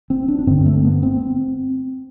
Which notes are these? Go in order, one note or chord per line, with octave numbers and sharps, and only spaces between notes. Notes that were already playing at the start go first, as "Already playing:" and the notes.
C4
D4
D4
G2 D3 C4
A3
B3
C4